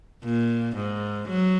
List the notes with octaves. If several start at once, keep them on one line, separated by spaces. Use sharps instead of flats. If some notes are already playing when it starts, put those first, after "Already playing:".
A#2
G#2
F#3